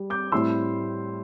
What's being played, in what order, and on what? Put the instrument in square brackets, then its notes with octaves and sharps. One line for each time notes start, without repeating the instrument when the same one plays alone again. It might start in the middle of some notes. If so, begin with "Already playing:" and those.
Already playing: [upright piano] G3
D6 G6
A2 G3 C4 E4 C6 E6